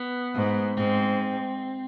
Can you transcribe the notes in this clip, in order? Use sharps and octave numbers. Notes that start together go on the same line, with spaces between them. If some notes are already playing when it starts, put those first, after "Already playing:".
Already playing: B3
G#2
G#2 C4